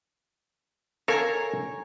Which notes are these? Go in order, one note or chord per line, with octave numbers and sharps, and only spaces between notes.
A4 A#4 C#5 F5 G#5 A#5